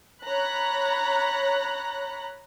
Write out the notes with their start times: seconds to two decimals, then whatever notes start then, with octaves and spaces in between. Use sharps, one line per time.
0.24 C#5 A#5 B5 F#6